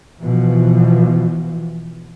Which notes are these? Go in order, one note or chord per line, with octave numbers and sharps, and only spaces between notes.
B2 E3 F3